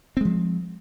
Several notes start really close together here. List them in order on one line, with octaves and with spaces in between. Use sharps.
C4 G#3 F3